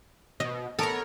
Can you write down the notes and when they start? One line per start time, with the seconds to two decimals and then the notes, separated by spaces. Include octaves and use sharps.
0.40 B2 D#5
0.79 B3 A4 A#4 C#5 A#5